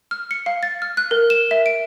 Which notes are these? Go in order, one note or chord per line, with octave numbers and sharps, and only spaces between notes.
F6
C#7
F5
A6
F6
F#6
A#4
E7
E5
D7